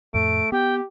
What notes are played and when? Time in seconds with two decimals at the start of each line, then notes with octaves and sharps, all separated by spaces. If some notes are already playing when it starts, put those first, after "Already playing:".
0.14 F2 A2 A3 D7
0.52 B3 G4 G5